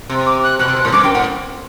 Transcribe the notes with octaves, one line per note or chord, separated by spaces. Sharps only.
C3
D6
F#6
B2 F#6
C3
B2
A2
G2 D6
F#2 G5
A2 F#5